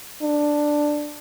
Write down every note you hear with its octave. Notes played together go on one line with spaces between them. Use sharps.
D4